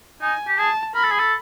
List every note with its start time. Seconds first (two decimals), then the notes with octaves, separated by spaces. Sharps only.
0.21 D#4 G#5
0.48 G4
0.58 G#4 A5
0.95 A#4 B5
1.03 A4
1.11 G#4
1.20 A4